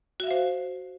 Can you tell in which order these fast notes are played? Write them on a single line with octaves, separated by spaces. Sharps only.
F#4 E5 F5 C5